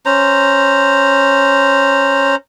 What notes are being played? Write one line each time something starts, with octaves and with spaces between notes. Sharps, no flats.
C#4 C5 A#5